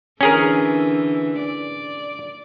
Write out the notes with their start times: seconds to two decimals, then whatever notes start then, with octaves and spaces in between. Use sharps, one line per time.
0.21 D3 E3 C#4 G#4 A#4
1.39 D5